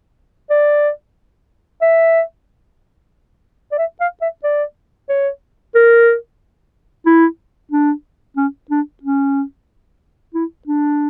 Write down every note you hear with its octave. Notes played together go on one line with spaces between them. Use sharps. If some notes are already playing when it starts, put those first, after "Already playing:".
D5
E5
D5
E5
F5
E5
D5
C#5
A#4
E4
D4
C#4
D4
C#4
E4
D4